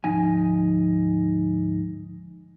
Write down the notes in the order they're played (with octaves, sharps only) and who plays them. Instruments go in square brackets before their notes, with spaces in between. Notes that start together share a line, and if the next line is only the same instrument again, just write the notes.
[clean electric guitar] D2 G#2 F3 D#4 G#5